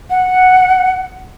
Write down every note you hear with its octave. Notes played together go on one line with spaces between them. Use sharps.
F#5